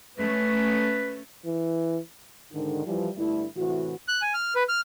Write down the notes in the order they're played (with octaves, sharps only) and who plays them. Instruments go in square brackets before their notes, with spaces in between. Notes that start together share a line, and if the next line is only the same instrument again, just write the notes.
[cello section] A3 C#4 [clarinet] B4
[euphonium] E3
[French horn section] G#2 D3 D#3
E3 F3 G3
G2 D3 A3 E4
A2 C3 E3 F#4
[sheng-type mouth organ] F#6
G#5
F6
B4
F6